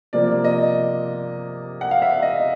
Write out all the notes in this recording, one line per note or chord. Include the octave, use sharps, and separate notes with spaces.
C3 F3 A#3 D5
D#5
F#5
F5
E5
D#5